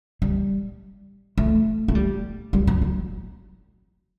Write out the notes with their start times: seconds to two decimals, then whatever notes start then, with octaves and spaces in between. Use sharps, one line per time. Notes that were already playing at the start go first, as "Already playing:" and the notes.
0.22 G3
1.38 A3
1.88 A3
1.95 G3
2.53 G3
2.67 F#3
2.82 F#3